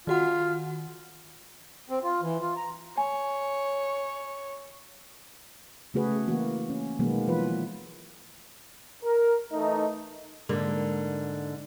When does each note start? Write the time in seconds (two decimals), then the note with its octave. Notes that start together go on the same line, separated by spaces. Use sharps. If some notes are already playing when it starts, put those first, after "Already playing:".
0.07 D#3 F4 F#4 F#5
1.90 C4
2.03 F4
2.22 E3
2.41 F4
2.57 A#5
2.98 C#5 G#5
5.94 C#3 A3 B3 F#4 G#4 B4
6.27 E3 A#3 F#4
6.69 C#4
6.99 B2 D#3 F#3 G#3 A#3 B3
7.27 E3 F3 F4 B4
9.02 A#4
9.52 E3 A3 D#4
10.49 G#2 D3 A#3